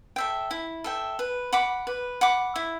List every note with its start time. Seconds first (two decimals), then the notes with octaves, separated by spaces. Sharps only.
0.16 A4 E5 G5
0.51 E4
0.84 A4 E5 G5
1.19 B4
1.53 F#5 B5 D6
1.87 B4
2.21 F#5 B5 D6
2.56 E4